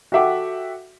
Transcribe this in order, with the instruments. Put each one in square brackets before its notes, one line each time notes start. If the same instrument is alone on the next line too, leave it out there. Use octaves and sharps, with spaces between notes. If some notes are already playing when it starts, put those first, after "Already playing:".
[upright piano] F#4 G4 A4 E5 F#5 D6